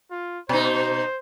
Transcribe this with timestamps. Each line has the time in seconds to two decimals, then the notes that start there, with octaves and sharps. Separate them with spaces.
0.11 F4
0.49 B2 D#4 C5